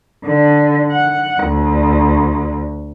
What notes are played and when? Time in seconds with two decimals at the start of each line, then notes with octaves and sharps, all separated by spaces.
0.24 D3
0.92 F#5
1.45 D2